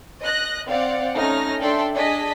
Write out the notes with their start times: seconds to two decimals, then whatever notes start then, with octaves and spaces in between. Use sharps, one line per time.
0.22 D#5 F#6 A#6
0.68 C4 D5 F5 F#5
1.16 A3 C#4 D#4 F6 A#6
1.60 D4 A4 D5 E5 G5 C6
1.94 D4 G#4 D#5 A5 B6